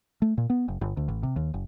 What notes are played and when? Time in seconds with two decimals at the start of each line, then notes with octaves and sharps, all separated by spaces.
0.22 A3
0.38 A#2
0.50 B3
0.68 F#1
0.81 G1
0.97 D2
1.08 A1
1.23 C3
1.36 D#2
1.54 F#1